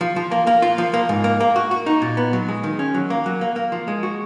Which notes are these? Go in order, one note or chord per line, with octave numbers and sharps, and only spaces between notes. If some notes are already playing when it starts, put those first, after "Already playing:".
F3
F3
A#3
A#3
F4
F3
A#3
G#2
A#3
A#3
F#4
F#4
D#4
A#2
B3
F#3
G#3
D#3
C#4
F#3
A#3
F#3
A#3
A#3
F3
G#3
F#4